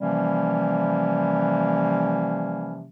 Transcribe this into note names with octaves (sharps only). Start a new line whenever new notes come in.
C3 E3 F3 G3 A#3 C#4